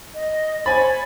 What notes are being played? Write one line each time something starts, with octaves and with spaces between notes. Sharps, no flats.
D#5
C5 C#5 G#5 B5 A6